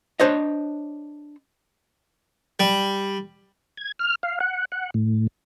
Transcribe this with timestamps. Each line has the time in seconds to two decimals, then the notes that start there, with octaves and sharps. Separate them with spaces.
0.20 D4 C5 C#5 D#5
2.60 G3
3.77 G#6
3.99 F6
4.23 F5
4.40 F#5
4.72 F#5
4.94 A2